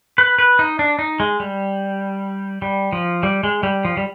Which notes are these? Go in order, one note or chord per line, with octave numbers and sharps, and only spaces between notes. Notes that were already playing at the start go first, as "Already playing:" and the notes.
B4
B4
D#4
D4
D#4
G#3
G3
G3
F3
G3
G#3
G3
F3
G3